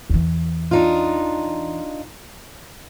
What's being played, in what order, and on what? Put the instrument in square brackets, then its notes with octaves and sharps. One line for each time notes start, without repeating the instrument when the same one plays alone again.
[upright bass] E2 E3
[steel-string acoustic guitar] D4 D#4 F4